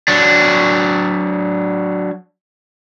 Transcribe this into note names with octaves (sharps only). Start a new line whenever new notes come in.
F#3 D4